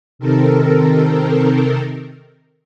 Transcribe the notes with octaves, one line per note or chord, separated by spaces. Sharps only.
C3 D#3 C4 A4 A#4